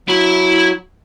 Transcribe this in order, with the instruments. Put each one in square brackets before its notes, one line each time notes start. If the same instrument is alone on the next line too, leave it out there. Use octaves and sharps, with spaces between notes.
[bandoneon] F#3 [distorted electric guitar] E4 B5